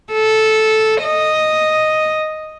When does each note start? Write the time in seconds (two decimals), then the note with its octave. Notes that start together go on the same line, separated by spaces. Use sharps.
0.13 A4
1.02 D#5